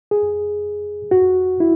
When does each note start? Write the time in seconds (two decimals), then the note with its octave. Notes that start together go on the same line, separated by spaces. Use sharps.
0.11 G#4
1.11 F#4
1.60 E4